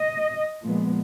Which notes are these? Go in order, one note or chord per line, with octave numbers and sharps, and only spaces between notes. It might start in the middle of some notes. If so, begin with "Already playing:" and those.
Already playing: D#5
A#2 F3 G#3 B3